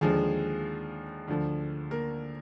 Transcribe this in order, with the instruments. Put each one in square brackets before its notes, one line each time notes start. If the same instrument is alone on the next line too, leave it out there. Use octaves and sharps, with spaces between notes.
[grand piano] D#2 D3 F3 G#3 G#4
D2 D3 F3
A#3 A#4